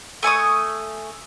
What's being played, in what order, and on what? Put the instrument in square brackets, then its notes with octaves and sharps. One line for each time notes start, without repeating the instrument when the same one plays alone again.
[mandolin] A3 G#5 C#6 D#6